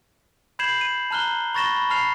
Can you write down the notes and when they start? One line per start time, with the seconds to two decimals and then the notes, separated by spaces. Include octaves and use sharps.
0.59 B5 G6 G#6 C7 E7 F#7
0.81 D#7
1.11 A5 A#5 F6 F#6 G7
1.54 B5 C#6 A6 A#6 E7 G7
1.77 B5
1.90 A5 B5 F6 C7 F7